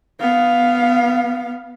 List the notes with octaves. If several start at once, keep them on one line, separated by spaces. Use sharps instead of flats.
B3 F5